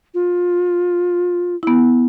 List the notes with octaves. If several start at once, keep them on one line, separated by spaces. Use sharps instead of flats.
F4
B3 E4